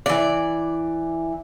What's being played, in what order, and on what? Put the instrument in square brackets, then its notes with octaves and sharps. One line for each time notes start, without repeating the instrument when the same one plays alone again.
[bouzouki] E3 D5